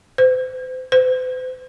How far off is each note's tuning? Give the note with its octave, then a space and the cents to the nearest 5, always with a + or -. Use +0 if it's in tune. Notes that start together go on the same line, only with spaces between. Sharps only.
C5 -40
C5 -45